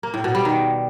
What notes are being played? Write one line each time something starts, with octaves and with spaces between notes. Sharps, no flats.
A#3
A2
B2
G3
D#3